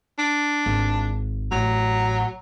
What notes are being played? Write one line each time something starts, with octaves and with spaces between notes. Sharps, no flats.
D4
G#1
A1 F#3